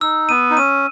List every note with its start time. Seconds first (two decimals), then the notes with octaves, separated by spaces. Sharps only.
0.01 D#4 E6
0.29 B3 D#7
0.50 D#4
0.57 C#4 D#7